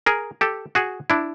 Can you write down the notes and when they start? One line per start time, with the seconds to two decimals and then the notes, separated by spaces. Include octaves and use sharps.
0.06 G#4 A#4
0.41 G4 A4
0.75 F#4 G#4
1.10 D4 E4